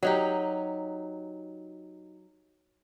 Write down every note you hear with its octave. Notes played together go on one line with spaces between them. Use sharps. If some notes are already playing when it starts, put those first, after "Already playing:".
F#3 D#4 G4